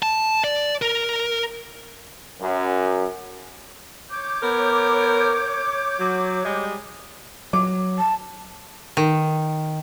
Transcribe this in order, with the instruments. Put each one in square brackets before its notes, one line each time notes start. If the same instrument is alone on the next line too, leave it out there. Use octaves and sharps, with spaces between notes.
[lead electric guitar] A5
D5
A#4
[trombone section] F#2
[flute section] C#5 D6 G6
[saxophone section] B3 A#4
F#3
G3 G#3
[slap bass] F#3 [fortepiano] D6
[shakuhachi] A5
[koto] D#3